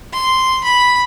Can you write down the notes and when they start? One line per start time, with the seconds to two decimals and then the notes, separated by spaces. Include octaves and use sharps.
0.13 C6
0.64 B5